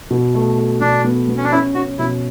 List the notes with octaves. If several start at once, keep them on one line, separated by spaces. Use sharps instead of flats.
B2
A3
A3
B2 D4
B3
B3
C#4
D4
C#4 E4
C#4 F#4
B2 E4